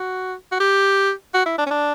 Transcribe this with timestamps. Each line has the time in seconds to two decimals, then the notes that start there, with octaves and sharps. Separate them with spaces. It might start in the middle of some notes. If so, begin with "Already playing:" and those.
Already playing: F#4
0.52 F#4
0.60 G4
1.34 F#4
1.46 E4
1.58 D4
1.66 C#4
1.71 D4